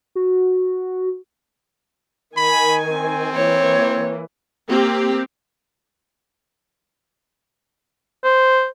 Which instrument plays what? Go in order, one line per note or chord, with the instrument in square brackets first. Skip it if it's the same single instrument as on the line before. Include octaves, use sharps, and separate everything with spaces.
[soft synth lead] F#4
[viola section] D#3 G#5 [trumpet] B5
[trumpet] C4
[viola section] E3 A#3 [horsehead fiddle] C#5
[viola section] A#3 C4 G4
[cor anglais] C5